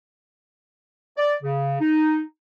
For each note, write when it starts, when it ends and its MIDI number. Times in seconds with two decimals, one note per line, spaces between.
1.17 1.34 74
1.43 1.76 49
1.80 2.21 63